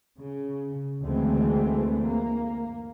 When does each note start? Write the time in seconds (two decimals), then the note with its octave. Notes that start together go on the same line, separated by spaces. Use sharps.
0.20 C#3
1.04 D2 E3 G#3 A3 C4
2.07 A#3